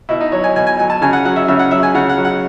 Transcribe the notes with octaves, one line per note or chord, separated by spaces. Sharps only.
B2 E4
D#4
F#3 C#5
G#5
B2 G#5
G#5
F#3 G#5
A5
C#3 G#5
F#5
F#3 F#5
E5
C#3 E5
F#5
F#3 E5
G#5
C#3 F#5
F#5
F#3
F#5